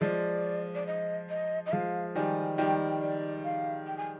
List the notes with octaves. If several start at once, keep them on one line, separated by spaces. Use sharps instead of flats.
F3 G#3 D5
D5
D#5
D#5
D#5
F3 G#3 F5
D#3 G3 G#5
D#3 G3 G5
D5
F5
G5
G#5